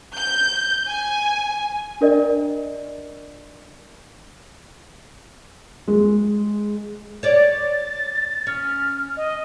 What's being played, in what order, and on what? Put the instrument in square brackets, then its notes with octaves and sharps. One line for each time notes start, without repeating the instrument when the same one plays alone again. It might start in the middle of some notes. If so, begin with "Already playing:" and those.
[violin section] G6
G#5
[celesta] D4 A#4 D5 D#5
[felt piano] G#3
[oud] C#5 D5 [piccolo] A6
[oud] C#4 [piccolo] F6
[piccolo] D#5